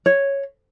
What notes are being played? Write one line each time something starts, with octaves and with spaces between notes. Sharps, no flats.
C#5